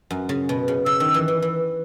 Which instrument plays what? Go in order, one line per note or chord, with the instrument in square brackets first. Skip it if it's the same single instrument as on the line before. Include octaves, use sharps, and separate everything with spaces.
[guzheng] F#2
C#3
B2
C#3
[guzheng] C#3 [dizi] E6
[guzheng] D#3
E3
E3
E3